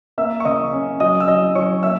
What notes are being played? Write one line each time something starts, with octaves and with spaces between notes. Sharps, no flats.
A#3 E5 E6
C#6
C#3 D#5 D#6
C#4
F#3 D#5 D#6
E6
F#3 D#5 D#6
F#3 C#5 C#6
A#3 E5 E6